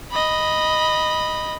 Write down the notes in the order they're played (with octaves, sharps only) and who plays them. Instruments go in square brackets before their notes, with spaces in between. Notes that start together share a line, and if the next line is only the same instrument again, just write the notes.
[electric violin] D#5 B5